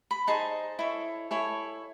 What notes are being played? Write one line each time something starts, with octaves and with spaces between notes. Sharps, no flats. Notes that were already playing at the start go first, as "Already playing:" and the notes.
B5
D#4 G#4 C5 D#5 A5
E4 A4 C#5
E4 A4 C#5 G#5